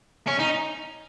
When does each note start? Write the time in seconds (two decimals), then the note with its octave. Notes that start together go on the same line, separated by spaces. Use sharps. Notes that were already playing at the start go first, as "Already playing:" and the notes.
0.27 C#4
0.39 D#4